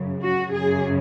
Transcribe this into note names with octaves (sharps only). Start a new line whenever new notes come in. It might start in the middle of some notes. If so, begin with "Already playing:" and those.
Already playing: F#2 C#3
F#4
F#2 C#3 G#4